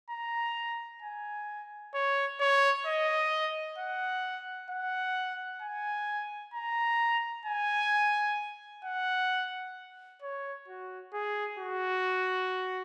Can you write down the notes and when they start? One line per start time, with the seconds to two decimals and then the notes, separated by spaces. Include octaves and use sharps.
0.10 A#5
1.02 G#5
1.94 C#5
2.40 C#5
2.86 D#5
3.78 F#5
4.70 F#5
5.62 G#5
6.54 A#5
7.46 G#5
8.84 F#5
10.22 C#5
10.68 F#4
11.13 G#4
11.59 F#4